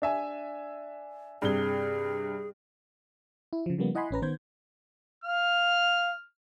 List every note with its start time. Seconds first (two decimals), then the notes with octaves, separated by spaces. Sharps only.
0.02 D4 E5 G#5
1.42 G2 C3 G#4 G7
3.53 E4
3.66 C#3 F3
3.78 C#3 F3 G3 A#3 B3
3.95 E4 D#5 F#5 G#5 B5 C6
4.11 A1 C#4 B4 A#5
4.22 D#3 B3 C5 G6 G#6
5.24 F5 F6